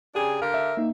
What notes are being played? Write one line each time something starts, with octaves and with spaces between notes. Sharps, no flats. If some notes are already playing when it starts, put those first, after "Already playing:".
C#3 D4 G4 G#4 G5 G#5
D3 G4 A#4 F5
E5
A#3 D#4